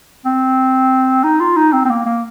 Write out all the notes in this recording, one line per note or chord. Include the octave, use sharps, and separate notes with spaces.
C4
D#4
F4
D#4
C4
C4
A#3
A#3